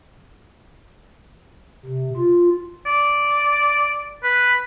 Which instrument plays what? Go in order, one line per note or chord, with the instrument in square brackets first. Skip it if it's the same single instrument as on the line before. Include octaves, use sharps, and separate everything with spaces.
[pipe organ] C3
F4
[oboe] D5
B4